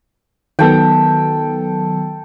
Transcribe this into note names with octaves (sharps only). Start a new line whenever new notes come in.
D#3 F#3 B3 A4 G5